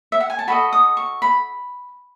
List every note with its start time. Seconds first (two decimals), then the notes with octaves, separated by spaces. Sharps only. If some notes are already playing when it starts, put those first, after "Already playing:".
0.12 E5
0.20 F#5
0.30 G#5
0.39 A5
0.47 F#4 A4 D#5 B5
0.73 D#6
0.97 C#6
1.22 B5